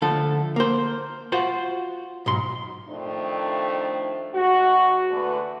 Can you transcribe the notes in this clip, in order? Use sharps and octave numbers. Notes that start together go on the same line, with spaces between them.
D3 F3 A3 A4
A#3 C5
F4 F#4 C5
B1 G#2 C6
F2 D#3 A3 D4 C5
G#2 F#4
E2 D3 A3 B4